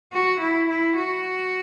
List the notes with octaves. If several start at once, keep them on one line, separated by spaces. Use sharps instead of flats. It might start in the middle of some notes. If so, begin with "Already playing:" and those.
F#4
E4
E4
F#4